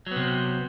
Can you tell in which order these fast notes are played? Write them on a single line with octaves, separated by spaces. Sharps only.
F#3 B3 C3